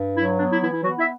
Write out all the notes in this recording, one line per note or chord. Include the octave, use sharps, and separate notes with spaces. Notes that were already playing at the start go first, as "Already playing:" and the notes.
Already playing: G2
F#3 E4
B3 D4
E4
E3 E4
E4
F#3 B3 F#4
E4 E5